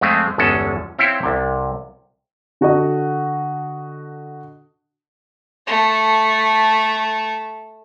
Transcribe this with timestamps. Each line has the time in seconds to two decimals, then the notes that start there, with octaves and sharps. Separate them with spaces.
0.01 F2 G#3 A3 C4
0.38 G1 E2 G#3 C#4 A4
0.99 C4 E4 C#5 E5 F5 G5
1.23 C2 C3
2.61 D3 F#4 A4 D#5
5.67 A3 A4